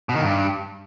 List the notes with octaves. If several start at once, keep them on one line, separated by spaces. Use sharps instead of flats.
B2
D#3
G2